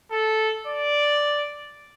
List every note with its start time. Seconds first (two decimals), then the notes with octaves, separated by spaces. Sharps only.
0.12 A4
0.67 D5